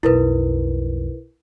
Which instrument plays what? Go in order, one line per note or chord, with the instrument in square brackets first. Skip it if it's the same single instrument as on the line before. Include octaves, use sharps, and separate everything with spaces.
[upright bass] B1 F2 [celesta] E4 A#4 B4